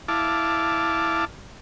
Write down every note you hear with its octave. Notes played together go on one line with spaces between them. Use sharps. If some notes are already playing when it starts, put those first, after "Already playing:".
E4 F5 A5 D6